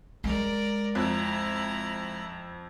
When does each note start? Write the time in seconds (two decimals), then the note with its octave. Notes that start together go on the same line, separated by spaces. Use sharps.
0.24 G#3 A#4 D5
0.95 F2 E4 A#5